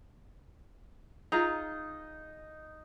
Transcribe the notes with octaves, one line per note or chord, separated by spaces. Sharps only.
D#4 F4 G#4 A#5